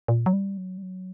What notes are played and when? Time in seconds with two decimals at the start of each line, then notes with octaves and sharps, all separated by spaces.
0.08 A#2
0.26 F#3
0.33 G3
0.57 F#3
0.78 G3
0.83 F#3